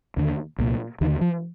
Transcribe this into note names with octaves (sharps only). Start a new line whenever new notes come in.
D#2 D3
C2 A#2
D#2 D3 D#3
F3